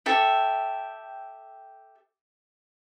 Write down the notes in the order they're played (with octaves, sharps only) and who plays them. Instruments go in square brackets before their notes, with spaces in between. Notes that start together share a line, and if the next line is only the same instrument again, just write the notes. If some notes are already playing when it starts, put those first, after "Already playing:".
[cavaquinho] G4 A4 E5 G5